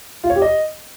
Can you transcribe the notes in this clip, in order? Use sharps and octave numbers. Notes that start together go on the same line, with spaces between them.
F4
C#5
G4
D#5